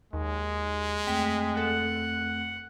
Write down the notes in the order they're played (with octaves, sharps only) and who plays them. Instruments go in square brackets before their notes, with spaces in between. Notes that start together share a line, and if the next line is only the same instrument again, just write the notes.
[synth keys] D#2 [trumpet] G#3
[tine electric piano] F2 A3 C4 [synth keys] G5 B6
[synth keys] A4 [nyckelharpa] F#5